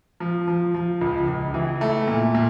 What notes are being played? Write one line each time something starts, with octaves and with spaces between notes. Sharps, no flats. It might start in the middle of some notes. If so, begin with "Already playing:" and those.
F3
F3
F3
C#2
C#2
E3
A3
A#2
A#2